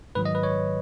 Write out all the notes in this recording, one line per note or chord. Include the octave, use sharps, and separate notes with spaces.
G#2 D#3 F#3 B4
D#5
B4
C#5